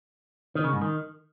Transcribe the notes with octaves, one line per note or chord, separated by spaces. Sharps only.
D#3
C#3
G#2
D#3